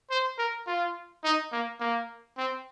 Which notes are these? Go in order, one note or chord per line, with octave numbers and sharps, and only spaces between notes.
C5
A#4
F4
D#4
A#3
A#3
C4